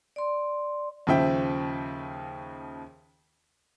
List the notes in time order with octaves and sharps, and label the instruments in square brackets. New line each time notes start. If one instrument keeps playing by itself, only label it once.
[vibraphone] D5 C6
[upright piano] D#2 C#3 F3 E5 G5